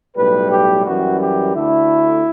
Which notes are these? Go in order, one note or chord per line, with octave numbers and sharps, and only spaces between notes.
B1 A2 G3 B4
G4
F#2 E3 G3 F#4
G4
D2 D3 A3 E4